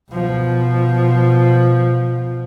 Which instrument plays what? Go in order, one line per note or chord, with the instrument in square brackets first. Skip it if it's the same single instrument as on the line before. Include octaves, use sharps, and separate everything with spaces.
[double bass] B2 F3